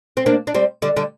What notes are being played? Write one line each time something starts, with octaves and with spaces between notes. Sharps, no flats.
C4
A#3 D4
D4
G3 C4
D3 G3
D3 G3